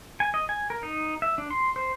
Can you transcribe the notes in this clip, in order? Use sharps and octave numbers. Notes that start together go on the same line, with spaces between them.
G#5
D#5
G#5
A#4
D#4
E5
D4
C6
C5